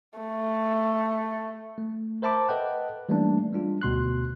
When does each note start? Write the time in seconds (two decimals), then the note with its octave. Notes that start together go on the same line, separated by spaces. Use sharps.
0.19 A3
1.78 A3
2.22 A#4 C5 E5 A5 B5 D6
2.49 A4 B4 D#5 F#5 G5 F#6
3.09 E3 G3 A3 A#3 C#4 D4
3.52 G3 G#3 D4 F4
3.82 D2 B2 C6 F#6